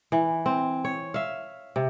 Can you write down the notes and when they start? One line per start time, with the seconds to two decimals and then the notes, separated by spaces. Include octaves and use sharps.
0.12 E3
0.46 C4
0.84 C#5
1.14 E5 F5
1.76 C3